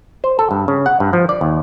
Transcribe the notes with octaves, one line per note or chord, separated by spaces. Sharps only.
C5
A4
G2
C#3
F#5
G2
F3
D5
D#2